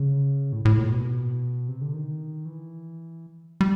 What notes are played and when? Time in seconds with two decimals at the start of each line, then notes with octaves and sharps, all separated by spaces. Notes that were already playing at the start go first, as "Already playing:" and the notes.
Already playing: C#3
0.52 A2
0.65 A2
0.78 A#2
0.91 B2
1.69 C3
1.81 D3
1.94 D#3
2.45 E3
3.61 G3